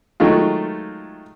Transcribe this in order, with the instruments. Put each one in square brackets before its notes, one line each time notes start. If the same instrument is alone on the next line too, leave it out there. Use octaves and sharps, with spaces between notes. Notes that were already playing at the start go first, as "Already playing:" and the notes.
[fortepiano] D#3 F#3 G#3 A3 F4